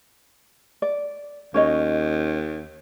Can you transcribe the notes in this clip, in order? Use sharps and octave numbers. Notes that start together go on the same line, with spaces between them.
D5
D#2 C#4 C#5 D#5